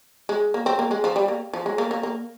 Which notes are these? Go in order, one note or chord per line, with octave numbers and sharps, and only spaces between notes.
G#3
A#3
C4
A#3
G#3
F3
G3
A#3
F3
G#3
A#3
A#3
A#3